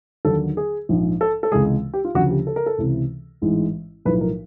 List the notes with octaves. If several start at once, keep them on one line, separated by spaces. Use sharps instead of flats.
D#2 D3 F#3 A4
G#4
A#1 G#2 F3
A4
A4
C#2 C3 E3 G#3 G#4
G4
F4
D2 C#3 F3 F#4
G4
A4
A#4
A4
C#2 C3 E3
A1 G#2 E3 G#3
B1 A2 F3 B4
A#4